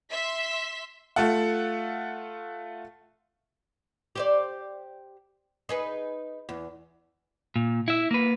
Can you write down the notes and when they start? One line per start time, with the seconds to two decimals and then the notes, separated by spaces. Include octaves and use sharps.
0.11 E5 C6 B6
1.16 A3 F4 A4 F#5
4.15 G4 C5 D5
5.69 D#4 G#4 B4
6.49 E2
7.56 A#2
7.88 E4 E5
8.11 A#3 B4